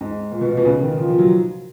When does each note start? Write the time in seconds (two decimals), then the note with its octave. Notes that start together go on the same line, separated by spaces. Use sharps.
0.01 G#2
0.32 A#2
0.41 B2
0.49 A#2
0.57 B2
0.65 C#3
0.81 D#3
0.98 F3
1.09 F3
1.18 F#3